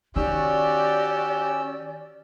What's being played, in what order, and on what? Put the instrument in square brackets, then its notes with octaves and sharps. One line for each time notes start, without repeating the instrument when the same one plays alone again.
[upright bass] D#3 [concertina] C#4 E6 [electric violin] F#4 G4 [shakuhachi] D5